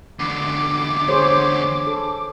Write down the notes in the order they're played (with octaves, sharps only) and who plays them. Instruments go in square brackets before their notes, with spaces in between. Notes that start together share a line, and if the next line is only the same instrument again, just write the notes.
[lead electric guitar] E2 D3 [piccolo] D6
[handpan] G#4 C5 C#5
A4